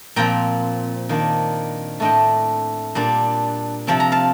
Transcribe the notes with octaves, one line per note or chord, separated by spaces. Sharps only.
A#2 F3 C4 G5 A#5
D#3 A#3 D4
A2 A3 D4 D#5 G5
A#2 G3 D4
C3 F3 C4 A5
A#5
F5 A5